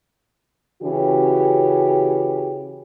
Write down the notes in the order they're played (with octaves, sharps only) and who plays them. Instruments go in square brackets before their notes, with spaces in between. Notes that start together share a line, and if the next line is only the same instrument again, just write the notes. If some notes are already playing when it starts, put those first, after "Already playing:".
[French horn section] C#3 E3 F#4 G4